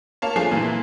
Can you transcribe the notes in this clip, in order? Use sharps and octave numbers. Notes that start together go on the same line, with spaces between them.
A#3 C#5 F5 A5
F3 A3 D4 G#4 C7
A#2 E3